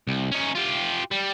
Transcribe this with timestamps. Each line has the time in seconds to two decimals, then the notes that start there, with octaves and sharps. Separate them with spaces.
0.07 C2
0.32 C#4 D#4
0.55 F4 G4
1.11 G3